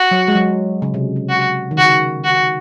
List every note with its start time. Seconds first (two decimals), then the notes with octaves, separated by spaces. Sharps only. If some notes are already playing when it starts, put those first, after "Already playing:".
Already playing: F#4
0.11 F#3
0.28 G#3
0.35 F#3
0.82 C#3
0.94 C3
1.16 C3
1.29 F#4
1.71 D#3
1.78 C#3 F#4
2.24 F#4